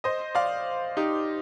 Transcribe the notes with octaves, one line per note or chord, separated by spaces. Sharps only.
C5 D#5
D5 F5
D#4 G4